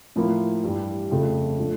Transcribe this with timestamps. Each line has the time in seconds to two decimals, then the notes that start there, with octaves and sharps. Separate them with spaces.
0.16 A2 F3 A#3 E4
0.64 G2 E3 G3
1.11 F2 C#3 F3 A3
1.58 A2 F3 A3 D4 F4